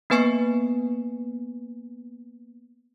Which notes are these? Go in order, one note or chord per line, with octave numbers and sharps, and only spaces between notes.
A#3 B3 B4 G#5 C#6 C7